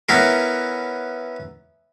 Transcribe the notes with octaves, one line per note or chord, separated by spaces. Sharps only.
B3 C#4 E4 A#4